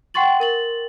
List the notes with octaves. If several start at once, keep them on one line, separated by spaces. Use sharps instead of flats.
F#5 G5 C6 C#6 A6 F#7
A#4 A6 F#7